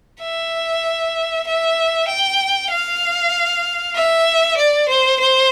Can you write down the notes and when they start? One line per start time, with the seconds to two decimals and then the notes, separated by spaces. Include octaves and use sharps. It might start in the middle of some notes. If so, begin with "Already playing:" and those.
0.21 E5
1.46 E5
2.08 G5
2.70 F5
3.95 E5
4.56 D5
4.88 C5
5.20 C5